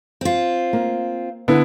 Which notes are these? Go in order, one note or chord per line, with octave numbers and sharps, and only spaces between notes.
C4 F4
A#3
D3 B3 E4